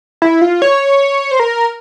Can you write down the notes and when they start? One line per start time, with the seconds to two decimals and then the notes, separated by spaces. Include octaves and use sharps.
0.22 E4
0.41 F4
0.62 C#5
1.31 C5
1.40 A#4